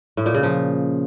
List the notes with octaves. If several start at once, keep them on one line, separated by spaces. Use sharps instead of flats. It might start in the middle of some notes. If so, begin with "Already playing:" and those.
A2
A#2
C#3
F3